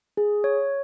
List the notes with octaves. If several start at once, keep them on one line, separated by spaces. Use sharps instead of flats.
G#4
C#5